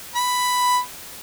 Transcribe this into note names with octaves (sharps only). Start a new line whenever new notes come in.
B5